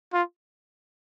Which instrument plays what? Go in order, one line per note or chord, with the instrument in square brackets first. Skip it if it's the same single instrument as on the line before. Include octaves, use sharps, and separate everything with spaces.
[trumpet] F4